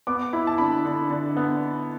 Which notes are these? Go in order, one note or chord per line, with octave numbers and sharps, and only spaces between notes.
B3 D6
E4 B5
A5
D3 B5
D3
D3
B3